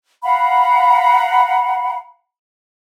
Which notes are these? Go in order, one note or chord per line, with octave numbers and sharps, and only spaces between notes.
F5 F#5 A#5 B5